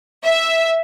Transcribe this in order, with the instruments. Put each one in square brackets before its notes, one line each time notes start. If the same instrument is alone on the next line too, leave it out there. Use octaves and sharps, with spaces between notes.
[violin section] E5